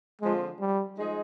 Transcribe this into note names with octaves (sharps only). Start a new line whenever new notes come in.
D3 F3 G#3 C4 F4
G3
F3 G#3 D#4 G#4